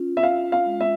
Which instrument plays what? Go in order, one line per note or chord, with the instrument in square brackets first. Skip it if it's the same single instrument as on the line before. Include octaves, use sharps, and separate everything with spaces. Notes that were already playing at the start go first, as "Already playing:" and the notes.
Already playing: [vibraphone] C#4 F4
[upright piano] E5
[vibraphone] F4 [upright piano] F5
[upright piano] F5
[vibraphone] G#3
[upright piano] E5